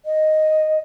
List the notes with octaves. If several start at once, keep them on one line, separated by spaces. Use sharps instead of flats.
D#5